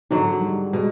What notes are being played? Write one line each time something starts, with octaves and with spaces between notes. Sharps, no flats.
G#2 D3 F#3 D#4
G3
B2 G#3